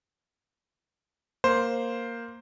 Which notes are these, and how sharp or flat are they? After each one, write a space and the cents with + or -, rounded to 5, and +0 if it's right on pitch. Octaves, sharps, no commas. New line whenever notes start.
A#3 +0 C5 +0